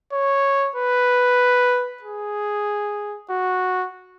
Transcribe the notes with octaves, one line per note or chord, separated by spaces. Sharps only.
C#5
B4
G#4
F#4